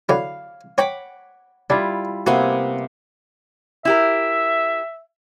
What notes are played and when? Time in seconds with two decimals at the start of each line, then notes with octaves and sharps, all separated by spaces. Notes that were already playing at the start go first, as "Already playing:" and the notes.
0.09 D3 F#3 E4 F5
0.78 C#5 F#5 G5 A#5 B5 D6
1.70 G3 D4 E4 F4
2.27 C3 A#3 B3 F#4 G#5
3.85 E4 G4 A#4 E5